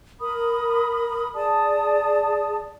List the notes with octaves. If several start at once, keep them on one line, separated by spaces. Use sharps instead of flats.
A#4 B5 D#6
G#4 D5 A5 D#6